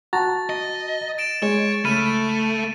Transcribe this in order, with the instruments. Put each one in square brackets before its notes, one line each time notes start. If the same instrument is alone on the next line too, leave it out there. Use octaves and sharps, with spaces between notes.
[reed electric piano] F#4 A5 A#5 [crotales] A6
[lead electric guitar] D#5
[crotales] A6 D7 E7
[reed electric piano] G#3 [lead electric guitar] C#5
[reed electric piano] C#2 B5 F6 [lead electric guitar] A3 [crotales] D#7